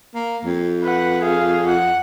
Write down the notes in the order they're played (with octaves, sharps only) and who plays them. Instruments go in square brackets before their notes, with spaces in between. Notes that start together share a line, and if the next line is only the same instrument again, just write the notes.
[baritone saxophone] A#3
F2
[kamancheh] B4 F#5
G#4 F5
F#5